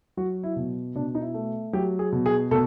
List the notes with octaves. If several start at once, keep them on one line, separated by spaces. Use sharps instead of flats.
F#3 F#4
E4
B2
B2 D4
D#4
E4
A3
F#3 G4
G#4
B2
G#4
B2 A4